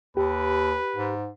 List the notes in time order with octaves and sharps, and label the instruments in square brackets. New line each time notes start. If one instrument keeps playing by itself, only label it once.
[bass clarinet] D#2 [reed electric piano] G4 [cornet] B4
[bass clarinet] G#2